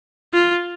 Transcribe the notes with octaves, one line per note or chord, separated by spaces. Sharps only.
F4